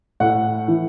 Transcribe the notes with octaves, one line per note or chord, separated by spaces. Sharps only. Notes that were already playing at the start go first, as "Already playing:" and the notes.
A2 F#5
E3